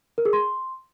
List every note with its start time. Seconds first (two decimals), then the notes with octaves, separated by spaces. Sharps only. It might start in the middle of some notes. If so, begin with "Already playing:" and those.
0.18 A#4
0.25 G#4
0.33 C6